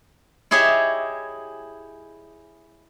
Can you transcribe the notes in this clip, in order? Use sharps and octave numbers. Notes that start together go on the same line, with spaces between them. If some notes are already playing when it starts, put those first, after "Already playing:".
E4 G4 G#4 C#5 D#5 E5